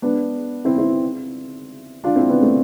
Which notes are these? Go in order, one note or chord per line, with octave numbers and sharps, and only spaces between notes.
B3 D4
C4 E4
C4 E4
D4 F4
C4 E4
B3 D4
A3 C4